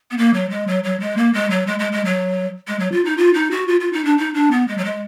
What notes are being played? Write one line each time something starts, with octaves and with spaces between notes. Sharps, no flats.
B3
A#3
F#3
G#3
F#3
F#3
G#3
A#3
G#3
F#3
G#3
G#3
G#3
F#3
G#3
F#3
F4
D#4
F4
D#4
F#4
F4
F4
D#4
D4
D#4
D4
B3
G#3
F#3
G#3